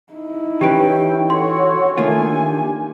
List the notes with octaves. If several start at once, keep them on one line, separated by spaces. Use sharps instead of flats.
D#4 E4
E3 C#4 G4 B4 G5 D7
F#4 A4 C#5 C6
D#3 A3 A#3 D4 F4 G#5
G4